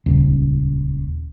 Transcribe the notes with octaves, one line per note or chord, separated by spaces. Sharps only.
D#1 C#2